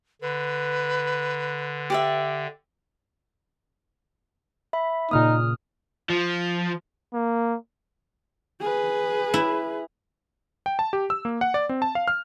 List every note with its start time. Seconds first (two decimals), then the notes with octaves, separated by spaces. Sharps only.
0.22 D3 B4
1.90 G4 D5 E5
4.73 E5 B5
5.11 A#2 C#3 A#3 D#4 D#6 F6
6.10 F3
7.13 A#3
8.61 G#4 B4
9.34 E4
10.66 G5
10.79 A5
10.93 G4
11.10 E6
11.25 A#3
11.41 F#5
11.54 D5
11.69 C4
11.82 A5
11.95 F5
12.08 F6